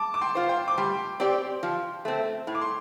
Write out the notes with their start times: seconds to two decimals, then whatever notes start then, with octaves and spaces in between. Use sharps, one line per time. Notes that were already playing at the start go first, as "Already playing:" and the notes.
Already playing: A5 D6
0.14 D6
0.21 G5 C6
0.35 F4 C5
0.49 G5 C6
0.68 D6
0.78 G3 G5 C6
1.20 C4 G4 D5
1.63 F3
2.05 A3 C4
2.47 A2
2.55 D6
2.61 C6